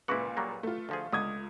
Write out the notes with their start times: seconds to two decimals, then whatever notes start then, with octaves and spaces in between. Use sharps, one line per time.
0.08 C#2 A#2 E4 F#4 B4 F#5 D6
0.37 F#3 G3 A#3
0.63 A3 F4
0.89 D2 F3 G#4
1.13 C#2 D3 D#6 G#6